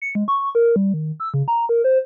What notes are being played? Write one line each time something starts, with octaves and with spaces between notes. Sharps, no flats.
C#7
G#3
C#6
A#4
G3
D#3
E6
C#3
A#5
A#4
C5